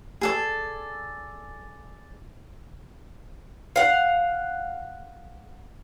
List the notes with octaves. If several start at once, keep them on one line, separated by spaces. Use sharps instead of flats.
G#4 A4 D5
F5 F#5